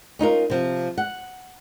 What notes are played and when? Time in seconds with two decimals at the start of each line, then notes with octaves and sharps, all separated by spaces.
0.19 C#4 D#4 F4 A#4
0.50 C3 F3
0.98 F#5